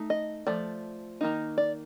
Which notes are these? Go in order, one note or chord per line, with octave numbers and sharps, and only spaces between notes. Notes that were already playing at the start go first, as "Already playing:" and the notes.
Already playing: A3 D#4
D#5
F3 A3 D5
D#3 A#3 D#4
D5